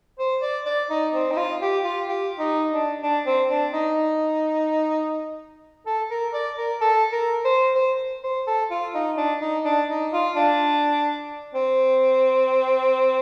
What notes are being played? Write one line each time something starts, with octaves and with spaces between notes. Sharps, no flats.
C5
D5
D5
D#4
C4
D#4
F4
G4
F4
G4
D#4
D4
D4
C4
D4
D#4
A4
A#4
D5
A#4
A4
A#4
C5
C5
C5
A4
F4
D#4
D4
D#4
D4
D#4
F4
D4
C4